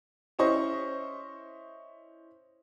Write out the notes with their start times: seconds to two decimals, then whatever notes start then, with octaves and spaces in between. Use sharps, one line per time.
0.39 C#4 E4 C5 D#5 C#6